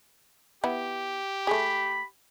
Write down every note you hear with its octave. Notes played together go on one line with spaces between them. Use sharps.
B3 E4 G4
A3 G#4 B5